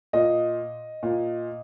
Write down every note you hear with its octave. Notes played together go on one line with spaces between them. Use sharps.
A#2 D#5
A#2